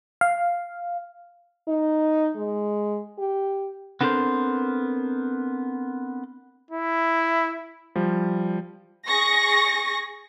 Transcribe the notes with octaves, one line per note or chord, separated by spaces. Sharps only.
F5
D#4
G#3
G4
B3 C4 D4 A4 A#4 C5
E4
F3 G3
G#4 C#6 A#6